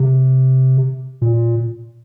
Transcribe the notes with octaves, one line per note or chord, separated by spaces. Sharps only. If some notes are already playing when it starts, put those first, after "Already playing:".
Already playing: C3
A#2